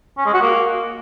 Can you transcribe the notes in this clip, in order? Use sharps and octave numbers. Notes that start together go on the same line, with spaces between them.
C#4
G#3
F#4
A#3